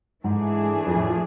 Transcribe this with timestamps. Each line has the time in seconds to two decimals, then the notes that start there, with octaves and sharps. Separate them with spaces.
0.24 G#2 E3 A3 D4 G#4
0.86 F2
0.97 A2
1.07 F3